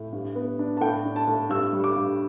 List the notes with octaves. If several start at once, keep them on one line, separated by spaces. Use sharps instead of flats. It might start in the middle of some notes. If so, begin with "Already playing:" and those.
Already playing: A2
G2
B3
D4
A5
A2 G5
D4
A5
A2
G2 E6
G3
D6
G2